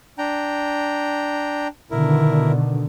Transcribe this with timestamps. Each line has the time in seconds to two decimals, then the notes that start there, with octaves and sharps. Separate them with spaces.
0.18 D4 G5 A#5
1.91 B2 D3 D#3 E4 A#4